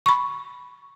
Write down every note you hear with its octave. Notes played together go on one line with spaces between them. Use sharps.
B5 C#6